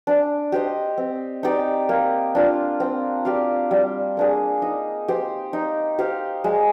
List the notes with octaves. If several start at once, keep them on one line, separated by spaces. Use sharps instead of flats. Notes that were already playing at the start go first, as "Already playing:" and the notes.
D4
G4 C5 D#5
C4
D#4 G4 D5
A#3
D4 F4
C4
G4 D5 F5
G3
A#3 D4 G#4
D#4
G4 C5
D#4
G4 C5 F5
G#3